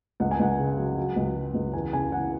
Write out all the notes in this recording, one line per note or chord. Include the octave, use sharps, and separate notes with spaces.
C#2 F#5
G#5
C#2 F#5
C#3
F#3
F#3
C#2
F#3
C#2
E2 G#5
C#3 G#5
E2 F#5